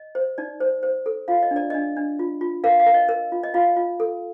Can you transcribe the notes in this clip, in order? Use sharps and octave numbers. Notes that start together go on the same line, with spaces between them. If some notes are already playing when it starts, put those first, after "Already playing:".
Already playing: D#5
C5
D#4 D5
C5
C5
A4
F4 F5
D#5
D4
D5
D4 D#5
D4
F4
F4
A#4 F5
F5
A#4
D#5
A#4
F4
D#5
F4 F5
F4
A4